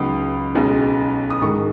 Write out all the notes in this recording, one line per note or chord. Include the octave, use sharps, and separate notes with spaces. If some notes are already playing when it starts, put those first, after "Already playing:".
Already playing: C#2 C#3 F#3 B3 D#4 D#6
B1 B2 G#3 C#4
D#6
G#2 D#3 G#3 C#6